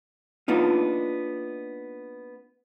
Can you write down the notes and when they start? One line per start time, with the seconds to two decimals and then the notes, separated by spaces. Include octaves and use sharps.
0.48 A#3 B3 D4 D#4 F4